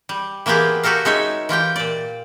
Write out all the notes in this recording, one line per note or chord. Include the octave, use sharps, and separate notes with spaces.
G3
E3 A#3 B3 F4 G4 G#4
F#4 G4 A4 A#4 F5
G#3 D#4 C#5 E5
E3 F4 G4 G5
A#2 D5